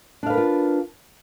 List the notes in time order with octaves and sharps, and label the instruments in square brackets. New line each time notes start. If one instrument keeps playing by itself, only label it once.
[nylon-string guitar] D4
F5
B4
A#4
F4